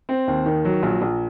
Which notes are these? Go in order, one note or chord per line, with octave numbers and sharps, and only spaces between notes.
C4
D#2
D#3
F#3
A#1
A#1